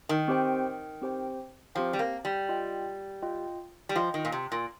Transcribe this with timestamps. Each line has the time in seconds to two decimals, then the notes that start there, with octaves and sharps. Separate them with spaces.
0.09 D#3
0.28 C4 G4 C5 G5
1.02 C4 G4 C5 G5
1.75 F3 C4 G4 C5 G5
1.93 G3
1.99 A#3
2.25 G3
2.49 F4 D#5 G5
3.22 F4 D#5 G5
3.89 G3
3.96 F3 F4 D#5 G5
4.14 D#3
4.25 A#2
4.32 C3
4.52 A#2